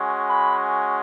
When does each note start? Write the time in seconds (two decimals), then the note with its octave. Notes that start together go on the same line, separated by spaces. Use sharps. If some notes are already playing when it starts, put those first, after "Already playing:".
Already playing: G#3 C#4 F#4
0.27 B5